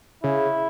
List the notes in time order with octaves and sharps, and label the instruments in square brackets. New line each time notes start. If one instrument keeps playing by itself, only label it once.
[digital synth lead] C#3 [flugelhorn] E4